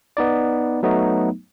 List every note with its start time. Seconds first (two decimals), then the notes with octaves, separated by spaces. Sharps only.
0.17 B3 D#4 D5
0.83 F#3 A3 B3 D#4